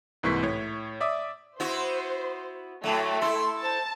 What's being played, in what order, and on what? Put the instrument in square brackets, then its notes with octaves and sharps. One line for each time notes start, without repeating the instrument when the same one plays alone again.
[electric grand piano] C2 G#2 E3 A#3 C#6 B6
A2 C#5
D5 E5 D6 D#6
[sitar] B3 E4 F#4 [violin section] C5
[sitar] A2 F#3 [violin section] A3
[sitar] E4 A4 [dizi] C6
[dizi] C5 [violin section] A5